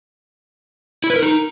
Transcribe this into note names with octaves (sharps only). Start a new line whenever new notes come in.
E4
B4
A#4
D#4